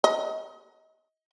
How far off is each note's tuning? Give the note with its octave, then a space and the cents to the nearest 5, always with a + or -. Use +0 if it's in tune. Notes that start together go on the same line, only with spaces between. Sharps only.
D#5 +30